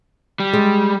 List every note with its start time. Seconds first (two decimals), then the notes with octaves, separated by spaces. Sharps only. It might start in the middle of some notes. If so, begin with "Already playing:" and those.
0.40 G3
0.53 G#3